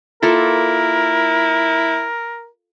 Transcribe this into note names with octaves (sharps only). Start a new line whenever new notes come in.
A#3 E4 F4 A4 A#4